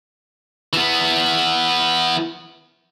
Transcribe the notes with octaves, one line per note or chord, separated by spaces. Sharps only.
E3 B3